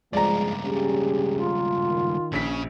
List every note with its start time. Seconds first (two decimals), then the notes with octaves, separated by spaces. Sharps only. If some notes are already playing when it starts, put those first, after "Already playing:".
0.13 C#2 G2 F3 G#3 D5 A#5
0.65 C#4 G4 G#4
1.35 F4
1.88 D#3
2.33 A#1 C#3 B6